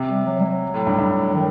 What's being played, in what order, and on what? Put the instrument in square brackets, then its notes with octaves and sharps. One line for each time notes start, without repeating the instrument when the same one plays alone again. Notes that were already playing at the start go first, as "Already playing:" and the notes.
Already playing: [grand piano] C3
[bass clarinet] G3
F#3
G3
F#3
[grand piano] A2
G2
G2
[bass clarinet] D#3